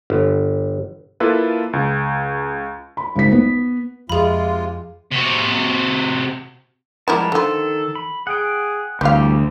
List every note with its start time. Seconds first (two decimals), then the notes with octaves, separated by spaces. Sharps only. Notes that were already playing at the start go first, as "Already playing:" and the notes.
0.10 G1
1.20 A#3 E4 F4 A4 B4
1.73 C#2
2.97 B5
3.16 G#1 C#2 B6
3.32 B3
4.09 F2 C3 G#3 F4 G#4 B5
5.12 C3 F#4
7.08 F3 G3 G#3 B3 E4 A#4 A5
7.32 D3 D#3 F3 A4
7.95 B5
8.27 G#4 F#5 G5
9.01 D2 E3 G3 C4 G4 F5 G6